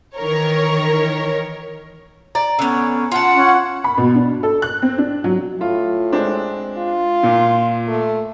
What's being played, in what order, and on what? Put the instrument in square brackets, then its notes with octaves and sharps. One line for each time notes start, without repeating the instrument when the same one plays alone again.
[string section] D#3 E3 A#4 C#5
[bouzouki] D5 [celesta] A#5
[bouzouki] D3 B3 [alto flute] C#4
[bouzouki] F4 A5 [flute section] F#5 [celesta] C6
[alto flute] C#4
[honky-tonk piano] B5
B2
D4
A4
F#6
C4
D4
F#3
[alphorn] A2 [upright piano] F4
[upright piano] G#3 C4 D4
[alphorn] F4
[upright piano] A#2
[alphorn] A3